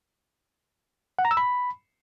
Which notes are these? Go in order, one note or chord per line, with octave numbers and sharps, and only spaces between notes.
F#5
A#5
E6
B5